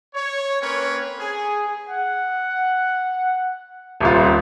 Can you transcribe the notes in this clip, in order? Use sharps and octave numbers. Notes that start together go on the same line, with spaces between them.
C#5
A#3 C4 C#4 B4 C#5
G#4
F#5
D#1 C2 F4